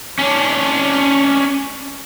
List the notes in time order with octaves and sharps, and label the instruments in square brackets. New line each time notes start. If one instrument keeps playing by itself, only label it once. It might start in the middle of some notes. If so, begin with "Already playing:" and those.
[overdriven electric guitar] C#4 D4